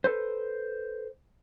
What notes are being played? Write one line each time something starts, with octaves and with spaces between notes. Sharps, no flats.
A4 B4 C5